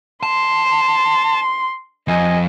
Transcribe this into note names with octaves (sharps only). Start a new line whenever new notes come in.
A5 C6
F2 D#5 G#5